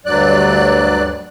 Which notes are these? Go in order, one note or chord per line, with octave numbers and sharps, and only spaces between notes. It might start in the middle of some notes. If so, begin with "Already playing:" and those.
D2 G2 F#3 D5 F#6